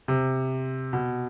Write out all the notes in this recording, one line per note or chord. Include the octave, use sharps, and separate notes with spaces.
C3
B2